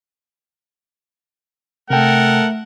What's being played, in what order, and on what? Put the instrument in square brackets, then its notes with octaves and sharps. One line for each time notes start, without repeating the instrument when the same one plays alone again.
[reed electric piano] C3 G5 [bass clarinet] A3 [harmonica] A4 A#4 [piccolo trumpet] F#5